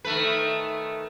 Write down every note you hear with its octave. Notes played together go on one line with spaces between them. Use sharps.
D#3 A3 B4